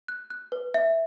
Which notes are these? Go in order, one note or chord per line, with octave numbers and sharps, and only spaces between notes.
F#6
F#6
B4
E5